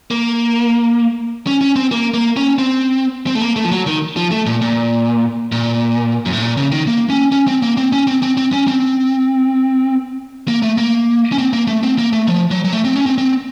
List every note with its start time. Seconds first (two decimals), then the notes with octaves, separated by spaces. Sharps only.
0.11 A#3
1.47 C#4
1.61 C#4
1.76 C4
1.92 A#3
2.14 A#3
2.36 C#4
2.58 C4
3.27 C4
3.35 A3
3.41 A#3
3.56 A3
3.65 F3
3.72 F#3
3.87 D#3
4.17 F3
4.32 A3
4.46 A#2
4.61 A#2
5.52 A#2
6.26 F#2
6.33 A2
6.42 A#2
6.57 C#3
6.72 D#3
6.87 A#3
7.10 C#4
7.32 C#4
7.47 C4
7.62 A#3
7.77 C4
7.92 C#4
8.07 C4
8.23 C4
8.37 C4
8.52 C#4
8.68 C4
10.48 A#3
10.62 A3
10.78 A#3
11.32 C#4
11.38 C4
11.53 A#3
11.67 A3
11.83 C4
11.98 A#3
12.13 A3
12.28 F3
12.51 F#3
12.65 F#3
12.72 A3
12.84 C4
12.96 C#4
13.06 C4
13.18 C4